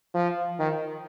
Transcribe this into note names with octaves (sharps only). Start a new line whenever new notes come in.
F3
D#3